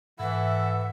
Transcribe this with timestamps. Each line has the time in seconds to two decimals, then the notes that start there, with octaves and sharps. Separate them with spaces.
0.19 G#2 E3 E4 A4 E5 F#5